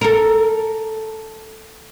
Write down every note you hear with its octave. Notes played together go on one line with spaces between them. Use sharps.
A4 A#4